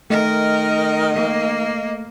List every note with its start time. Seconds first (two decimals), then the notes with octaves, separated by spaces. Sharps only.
0.10 D#3 A3 A#4 D#5
1.14 A#3